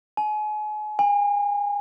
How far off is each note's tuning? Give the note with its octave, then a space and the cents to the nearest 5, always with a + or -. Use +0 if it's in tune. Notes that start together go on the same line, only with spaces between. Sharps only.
G#5 +35
G#5 -30